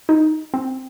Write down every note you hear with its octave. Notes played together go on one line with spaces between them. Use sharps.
D#4
C4